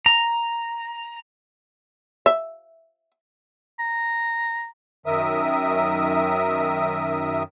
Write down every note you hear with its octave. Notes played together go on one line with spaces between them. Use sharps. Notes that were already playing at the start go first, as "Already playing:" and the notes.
A#5
E5
A#5
F#2 D#3 A#4 E5 D#6